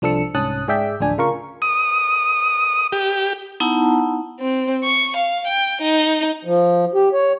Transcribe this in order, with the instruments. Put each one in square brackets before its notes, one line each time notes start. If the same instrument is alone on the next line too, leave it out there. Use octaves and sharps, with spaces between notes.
[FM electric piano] C2 F3 D4 A4 E6 C#7
C2 G#2 C#4 A5 D#6 F#6
G#2 G#4 D5 E5 G5 B6
A1 D2 F3 D4 G#5
C#3 F4 A#4 C#6
[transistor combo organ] D#6
G4
[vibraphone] B3 D#4 E4 F#5 A5 A#5
[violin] C4
C#6
F5
G5
D#4
[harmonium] F3
G4
C#5